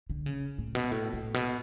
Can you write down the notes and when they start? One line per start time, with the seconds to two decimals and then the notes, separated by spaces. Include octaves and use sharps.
0.10 D3
0.26 C#3
0.58 A2
0.75 B2
0.91 A2
1.13 A2
1.34 B2